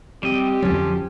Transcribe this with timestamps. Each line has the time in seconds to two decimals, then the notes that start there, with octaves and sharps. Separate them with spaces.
0.23 G3 C4 G4 D#5
0.62 F2 D3 F3 F#3 C#4